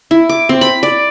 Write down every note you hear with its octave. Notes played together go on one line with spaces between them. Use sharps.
E4
D6
C4
B5
D5